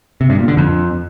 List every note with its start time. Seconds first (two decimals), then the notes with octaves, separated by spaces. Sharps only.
0.21 C3
0.30 G2
0.39 A#2
0.48 D3
0.57 F2